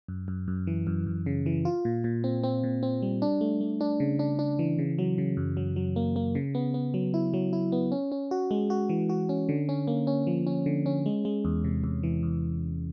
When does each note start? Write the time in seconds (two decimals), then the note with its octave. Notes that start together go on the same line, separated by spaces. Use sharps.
0.08 F#2
0.28 F#2
0.48 F#2
0.67 E3
0.87 F#2
1.07 F#2
1.26 C#3
1.46 E3
1.65 F4
1.85 A#2
2.04 A#2
2.24 C4
2.43 C4
2.64 A#2
2.83 C4
3.02 G3
3.22 D4
3.41 A3
3.61 A3
3.81 D4
4.00 C#3
4.19 D4
4.39 D4
4.59 E3
4.79 C#3
4.99 F#3
5.18 C#3
5.37 F#2
5.57 F#3
5.76 F#3
5.96 A#3
6.16 A#3
6.35 C#3
6.55 B3
6.74 B3
6.94 F#3
7.14 E4
7.34 F#3
7.53 E4
7.72 B3
7.92 C#4
8.12 C#4
8.31 F#4
8.51 G#3
8.70 F#4
8.89 E3
9.09 F#4
9.29 C#4
9.49 D3
9.69 C#4
9.87 A#3
10.07 C#4
10.27 F3
10.47 C#4
10.66 D3
10.86 C#4
11.06 G#3
11.25 G#3
11.45 E2
11.64 C3
11.84 E2
12.03 E3
12.23 E2